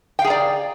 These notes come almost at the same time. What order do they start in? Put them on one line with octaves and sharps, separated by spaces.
G5 F5 G#4 A#5 D5